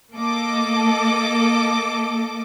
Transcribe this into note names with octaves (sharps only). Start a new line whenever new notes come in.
A#3 A4 D#5 D6